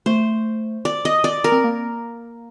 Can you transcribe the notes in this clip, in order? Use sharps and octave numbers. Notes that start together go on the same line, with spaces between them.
A3 C5
D5
D#5
D5
A#4
C4
A#3